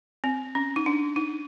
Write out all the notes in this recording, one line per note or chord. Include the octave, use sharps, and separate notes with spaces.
C4
C#4
D#4
D4
D#4